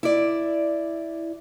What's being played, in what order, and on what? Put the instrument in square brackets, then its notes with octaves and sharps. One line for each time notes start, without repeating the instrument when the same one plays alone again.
[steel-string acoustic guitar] E4 D5